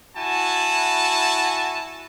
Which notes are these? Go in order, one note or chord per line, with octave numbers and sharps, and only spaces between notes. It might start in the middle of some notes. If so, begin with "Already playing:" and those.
E4 F#4 G#5 A5